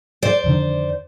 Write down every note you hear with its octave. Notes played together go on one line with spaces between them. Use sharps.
C5 D5
F2 D3 D#3